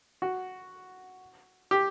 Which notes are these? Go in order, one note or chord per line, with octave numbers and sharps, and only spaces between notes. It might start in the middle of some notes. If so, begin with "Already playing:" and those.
F#4
G4